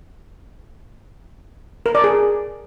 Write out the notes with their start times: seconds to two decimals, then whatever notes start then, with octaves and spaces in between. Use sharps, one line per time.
1.86 A#4
1.95 D5
2.04 G#4